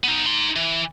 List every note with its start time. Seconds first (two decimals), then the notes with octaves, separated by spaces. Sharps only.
0.04 B3 D#4
0.26 D#4 C6
0.56 E3